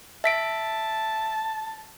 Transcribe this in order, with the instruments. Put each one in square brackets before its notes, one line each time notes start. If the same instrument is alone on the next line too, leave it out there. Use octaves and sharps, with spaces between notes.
[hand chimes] E5 B6 D7 [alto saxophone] A5